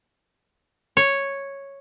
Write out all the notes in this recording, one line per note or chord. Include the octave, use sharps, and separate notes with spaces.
C#5